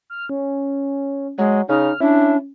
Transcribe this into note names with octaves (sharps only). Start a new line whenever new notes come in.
F6
C#4
F#3 G#3
C#3 D#4 F6
C#4 D4 E4